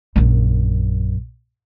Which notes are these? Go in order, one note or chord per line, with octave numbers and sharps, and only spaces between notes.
A#1 F#2